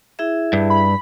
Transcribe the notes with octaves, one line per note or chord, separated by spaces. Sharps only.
E4 G#4 E5
G2
B5